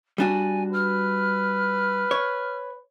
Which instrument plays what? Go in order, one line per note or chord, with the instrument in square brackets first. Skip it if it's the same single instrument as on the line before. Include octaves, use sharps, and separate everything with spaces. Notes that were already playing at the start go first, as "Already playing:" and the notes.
[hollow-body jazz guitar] G3 D4 F#4 [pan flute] G#5
[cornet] B4 [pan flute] F6
[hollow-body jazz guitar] C#5